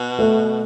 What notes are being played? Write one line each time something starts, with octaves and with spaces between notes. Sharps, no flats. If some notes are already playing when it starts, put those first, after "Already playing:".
Already playing: B2
A3